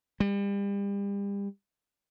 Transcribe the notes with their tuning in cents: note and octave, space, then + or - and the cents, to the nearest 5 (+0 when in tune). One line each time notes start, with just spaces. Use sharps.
G3 +35